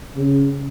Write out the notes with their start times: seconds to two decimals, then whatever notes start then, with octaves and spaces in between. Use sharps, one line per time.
0.16 C#3